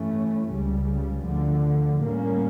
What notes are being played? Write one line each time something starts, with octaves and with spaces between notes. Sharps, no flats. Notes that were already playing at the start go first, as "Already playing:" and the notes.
Already playing: G2 E3 A3 C#4
C#2 C#3 G3
D2 D3 F3
A2 G3 A#3 C#4